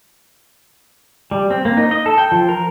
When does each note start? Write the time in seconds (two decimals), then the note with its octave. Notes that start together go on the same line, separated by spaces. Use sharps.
1.31 G3
1.50 C4
1.65 A#3
1.77 D#4
1.91 D#5
2.06 A4
2.18 G5
2.32 F3
2.49 A#4